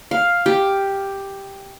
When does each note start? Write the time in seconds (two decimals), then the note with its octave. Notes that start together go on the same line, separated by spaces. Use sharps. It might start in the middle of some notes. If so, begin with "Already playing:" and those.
0.11 F5
0.46 G4